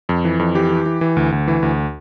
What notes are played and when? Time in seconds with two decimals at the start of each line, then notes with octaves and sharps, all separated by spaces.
0.09 F2
0.25 E3
0.39 F2
0.55 E3 G4
0.71 E3
0.86 E3
1.01 E3
1.17 D2
1.32 D2
1.48 E3
1.63 D2